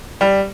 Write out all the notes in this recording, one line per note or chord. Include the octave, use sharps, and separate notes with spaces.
G3